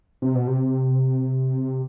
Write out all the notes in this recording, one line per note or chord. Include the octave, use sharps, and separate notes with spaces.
C3
B2
C3